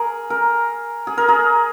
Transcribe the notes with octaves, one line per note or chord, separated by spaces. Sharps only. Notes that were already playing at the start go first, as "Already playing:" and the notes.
Already playing: G#4 A#4
A#4
G#4
A#4
G#4